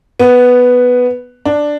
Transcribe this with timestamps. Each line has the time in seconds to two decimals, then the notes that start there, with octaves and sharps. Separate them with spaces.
0.20 B3
1.45 D4